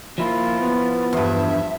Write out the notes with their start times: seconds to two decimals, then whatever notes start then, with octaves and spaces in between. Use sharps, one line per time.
0.18 F3 A#3 E4 F4
0.60 B3
1.13 E2 G2 E5